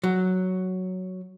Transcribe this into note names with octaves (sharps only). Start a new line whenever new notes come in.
F#3